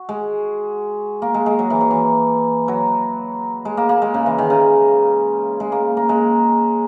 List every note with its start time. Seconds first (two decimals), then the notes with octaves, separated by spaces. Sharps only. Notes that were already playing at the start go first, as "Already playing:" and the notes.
Already playing: F#4
0.09 G#3
1.22 A#3
1.34 G#3
1.46 G#3
1.59 F#3
1.70 E3
1.81 F#3
1.91 E3
2.68 F#3
3.65 G#3
3.77 A#3
3.89 A#3
4.02 G#3
4.14 C#3
4.26 E3
4.38 D#3
4.50 C#3
5.60 G#3
5.72 A#3
5.97 A#3
6.09 G#3